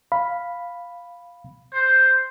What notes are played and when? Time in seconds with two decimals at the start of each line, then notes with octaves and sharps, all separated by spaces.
0.12 F5 B5
1.74 C5